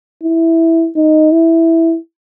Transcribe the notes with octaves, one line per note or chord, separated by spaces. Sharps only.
E4
D#4
E4